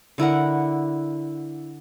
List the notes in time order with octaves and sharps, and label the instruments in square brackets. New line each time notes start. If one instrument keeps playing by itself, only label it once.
[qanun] D3 E4 A#4 F#5